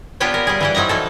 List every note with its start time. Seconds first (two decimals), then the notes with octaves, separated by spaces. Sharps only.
0.20 B3 D4 F4 G4 C#5 G#5
0.34 A#4
0.47 G3 G#4
0.61 E3 G4 F#5
0.75 F3 F#3 D#4 G#5 A#5
0.89 E3 F3 A4